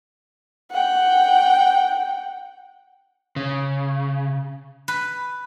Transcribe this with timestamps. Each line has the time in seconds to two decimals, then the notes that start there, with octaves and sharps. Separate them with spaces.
0.71 F#5 G5
3.36 C#3
4.88 B4